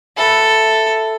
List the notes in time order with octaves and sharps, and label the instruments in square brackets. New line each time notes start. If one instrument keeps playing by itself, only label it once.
[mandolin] F#4 B4 E5 [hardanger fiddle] A4